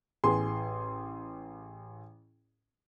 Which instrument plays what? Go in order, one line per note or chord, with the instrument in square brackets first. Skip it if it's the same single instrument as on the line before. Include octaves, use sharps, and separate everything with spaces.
[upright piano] A1 G#4 C6